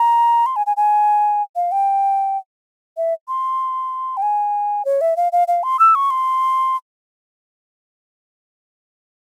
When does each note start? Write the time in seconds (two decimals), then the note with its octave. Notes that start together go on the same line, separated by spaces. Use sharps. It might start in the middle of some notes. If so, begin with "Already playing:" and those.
Already playing: A#5
0.46 C6
0.56 G#5
0.66 G#5
0.77 G#5
1.56 F5
1.72 G5
2.97 E5
3.28 C6
4.17 G5
4.22 G#5
4.85 C#5
5.01 E5
5.16 F5
5.32 F5
5.48 F5
5.63 C6
5.79 E6
5.95 C#6
6.10 C6